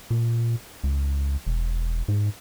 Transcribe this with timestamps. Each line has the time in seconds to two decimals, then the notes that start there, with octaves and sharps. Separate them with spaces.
0.11 A#2
0.84 C#2
1.46 E1
2.08 G#2